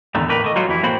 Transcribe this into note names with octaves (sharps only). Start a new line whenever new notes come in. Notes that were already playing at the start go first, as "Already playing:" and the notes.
E2 A#2 D3 D#3 A3
A2 A#3 A#4 B4
A3 D#5
F#3 G3 F4 F#4
F2 E3 E4
A2 A#3 C4 F#4 C5 B5